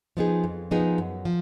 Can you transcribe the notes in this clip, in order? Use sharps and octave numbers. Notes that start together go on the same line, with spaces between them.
F3 B3 D#4 G#4
F2
F3 B3 D#4 G#4
F#2
F3